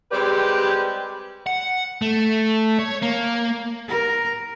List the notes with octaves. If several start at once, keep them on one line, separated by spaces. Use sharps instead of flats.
G3 G#3 C4 G4 B4 D5
F#5
A3
C#5
A#3
A#4